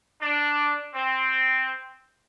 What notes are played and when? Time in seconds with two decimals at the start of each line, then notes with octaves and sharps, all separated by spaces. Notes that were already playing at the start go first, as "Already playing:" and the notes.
0.22 D4
0.94 C4